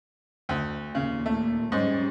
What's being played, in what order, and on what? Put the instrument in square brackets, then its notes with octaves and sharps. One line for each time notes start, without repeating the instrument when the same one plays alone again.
[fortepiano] D2
[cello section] D#2 A#2 [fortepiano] C#3
[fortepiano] A3
[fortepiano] G#2 [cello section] G3 G#3 C#4